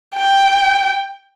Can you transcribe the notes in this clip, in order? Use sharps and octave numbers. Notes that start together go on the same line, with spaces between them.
G5